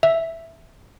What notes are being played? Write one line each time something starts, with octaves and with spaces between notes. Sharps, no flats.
E5